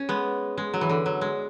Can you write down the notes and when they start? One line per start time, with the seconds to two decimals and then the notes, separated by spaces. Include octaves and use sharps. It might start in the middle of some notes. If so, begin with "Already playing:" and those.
Already playing: C#4
0.09 G#3 B3
0.58 G#3
0.74 F#3
0.81 E3
0.89 D3
1.06 F#3
1.21 G#3